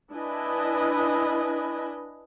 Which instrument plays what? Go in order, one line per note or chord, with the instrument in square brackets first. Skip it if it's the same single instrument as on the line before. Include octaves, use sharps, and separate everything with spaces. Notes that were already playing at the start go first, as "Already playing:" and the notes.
[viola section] D4 E4 B4 D#5 G#5 B5